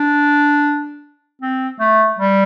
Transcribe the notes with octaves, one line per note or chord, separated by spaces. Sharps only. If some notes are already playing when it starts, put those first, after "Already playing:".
Already playing: D4
C4
A3
G3